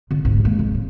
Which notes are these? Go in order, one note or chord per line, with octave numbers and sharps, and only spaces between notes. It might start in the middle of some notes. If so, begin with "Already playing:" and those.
D3 F4
D2 G#2
G#3 A#3
C#3
A2